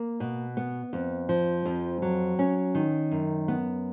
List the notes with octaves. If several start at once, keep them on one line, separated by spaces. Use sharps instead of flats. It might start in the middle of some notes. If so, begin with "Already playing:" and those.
Already playing: A#3
B2
B3
F2
F3
F2
F#3
C#4
D#3
F#2
B3